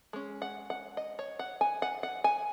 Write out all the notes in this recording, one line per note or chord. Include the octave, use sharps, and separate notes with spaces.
G#3 C#4
F#5
F#5
D#5
C#5
F#5
G#5
F#5
F#5
G#5